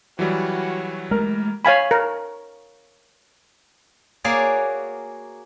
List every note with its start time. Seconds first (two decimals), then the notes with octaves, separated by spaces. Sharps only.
0.19 E3 F#3 G3 F#4 C#5
1.11 G#3 A3 A#4
1.65 C#5 F5 G#5 B5
1.91 A#4
4.24 A#3 F#4 G#4 C#5 D5